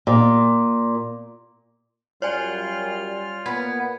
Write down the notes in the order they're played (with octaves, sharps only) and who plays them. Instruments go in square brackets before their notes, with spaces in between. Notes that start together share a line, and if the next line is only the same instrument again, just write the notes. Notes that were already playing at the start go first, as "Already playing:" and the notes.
[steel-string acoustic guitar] A#2
[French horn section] F#2 G3 [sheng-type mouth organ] F4 F6 [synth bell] C#5 D5 G#5
[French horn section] A#2 A#3 [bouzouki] B3 [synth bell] G#6